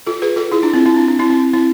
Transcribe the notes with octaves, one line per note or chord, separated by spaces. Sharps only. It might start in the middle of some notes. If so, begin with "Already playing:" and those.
F4 A4
G#4 B4
F4 A4
E4 G#4
D4 F4
C4 E4
C4 E4
D4
D4
C4 E4
C4 E4
C4 E4